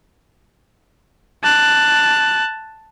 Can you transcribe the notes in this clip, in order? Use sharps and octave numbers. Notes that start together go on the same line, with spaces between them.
A5 F#6